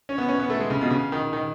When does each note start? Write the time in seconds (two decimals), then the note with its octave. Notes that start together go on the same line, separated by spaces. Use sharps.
0.09 C#4
0.18 B3
0.28 C#4
0.39 B3
0.50 A3
0.60 G#3
0.70 C#3
0.81 B2
0.91 C#3
1.12 D#3
1.33 D#3